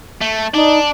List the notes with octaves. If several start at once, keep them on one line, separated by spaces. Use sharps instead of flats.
A3
D4 D#4 D5